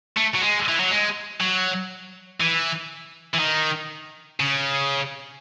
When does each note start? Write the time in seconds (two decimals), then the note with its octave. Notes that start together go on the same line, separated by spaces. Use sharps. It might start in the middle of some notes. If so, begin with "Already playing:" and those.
0.17 A3
0.35 F#3
0.42 G#3
0.68 E3
0.80 F#3
0.91 G#3
1.40 F#3
2.41 E3
3.35 E3
3.40 D#3
4.40 C#3